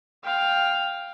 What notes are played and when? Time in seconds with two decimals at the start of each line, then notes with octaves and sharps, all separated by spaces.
0.24 F5 G5